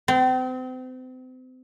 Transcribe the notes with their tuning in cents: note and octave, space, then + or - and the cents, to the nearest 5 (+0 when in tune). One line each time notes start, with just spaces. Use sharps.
C4 -35